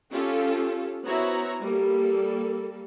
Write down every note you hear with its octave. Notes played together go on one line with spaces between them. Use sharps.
C#4 F4 G4 A4
B3 E4 F#4 C5 C#5 A#5
G3 A#3 A4